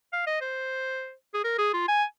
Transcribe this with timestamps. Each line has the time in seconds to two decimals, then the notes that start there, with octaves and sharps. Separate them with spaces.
0.13 F5
0.27 D#5
0.41 C5
1.34 G#4
1.44 A#4
1.58 G#4
1.73 F4
1.88 G#5